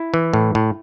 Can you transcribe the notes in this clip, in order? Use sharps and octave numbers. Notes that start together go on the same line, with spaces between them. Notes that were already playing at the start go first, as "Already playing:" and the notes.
Already playing: E4
E3
A2
A2